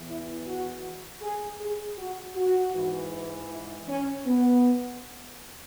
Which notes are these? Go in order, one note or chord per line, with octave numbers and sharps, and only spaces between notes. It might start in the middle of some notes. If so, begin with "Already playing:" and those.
Already playing: E2 E3
E4
F#4
G#4
G#4
F#4
F#4
G#2 E3
E4
C#4
B3